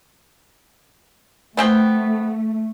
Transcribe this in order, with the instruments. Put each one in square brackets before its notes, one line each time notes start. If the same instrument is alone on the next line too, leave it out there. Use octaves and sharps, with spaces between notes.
[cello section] A3 [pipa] B3 C4 G5